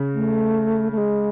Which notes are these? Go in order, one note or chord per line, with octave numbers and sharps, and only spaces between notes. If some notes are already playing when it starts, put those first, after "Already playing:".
Already playing: C#3
A3
A3
G#3